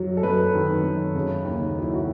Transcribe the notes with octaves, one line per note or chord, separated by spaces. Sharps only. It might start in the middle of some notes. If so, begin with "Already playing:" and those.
Already playing: F#2 F#3
A4
F#2 B4
D#3
F#2
C#3
D#2
F#3
E4
F#4